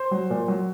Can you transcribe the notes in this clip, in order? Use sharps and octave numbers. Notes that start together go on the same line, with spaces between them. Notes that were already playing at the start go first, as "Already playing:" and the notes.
Already playing: C5
F#3
A#2
F#3